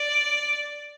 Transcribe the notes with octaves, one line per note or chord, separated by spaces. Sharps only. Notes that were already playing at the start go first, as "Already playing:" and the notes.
Already playing: D5